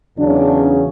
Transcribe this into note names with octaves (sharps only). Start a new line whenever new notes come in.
E2 C#3 F#3 C#4 D4